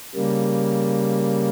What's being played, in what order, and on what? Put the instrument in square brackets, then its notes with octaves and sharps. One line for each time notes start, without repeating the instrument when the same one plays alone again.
[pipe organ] C#3 G3 A#3